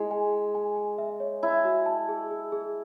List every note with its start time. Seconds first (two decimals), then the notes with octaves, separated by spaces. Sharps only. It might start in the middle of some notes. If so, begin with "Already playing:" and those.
Already playing: G#3 E4
0.11 G#5
0.32 G#5
0.55 G#5
0.76 G#5
0.98 E5
1.20 C#5
1.43 E4 C#5
1.65 F#4
1.86 A5
2.09 G#4
2.31 G#4
2.52 G#4